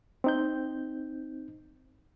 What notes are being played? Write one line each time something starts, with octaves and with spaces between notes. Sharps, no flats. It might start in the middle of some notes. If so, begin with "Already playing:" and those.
C4 D#4 G6